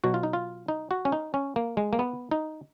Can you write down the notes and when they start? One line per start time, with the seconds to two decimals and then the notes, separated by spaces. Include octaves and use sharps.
0.04 B2 F#3 F#4
0.14 F4
0.23 D#4
0.33 F4
0.68 D#4
0.91 F#4
1.05 C#4
1.12 D#4
1.34 C#4
1.56 A#3
1.77 G#3
1.93 A#3
1.99 B3
2.31 D#4